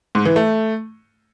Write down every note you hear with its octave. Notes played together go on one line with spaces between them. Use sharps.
G#2
E3
A3